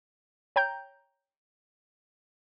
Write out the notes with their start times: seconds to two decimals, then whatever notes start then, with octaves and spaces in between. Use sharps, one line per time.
0.56 C#5 G5 A#5 G6